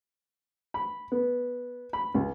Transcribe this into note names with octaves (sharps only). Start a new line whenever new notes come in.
B5
B3
B5
C#2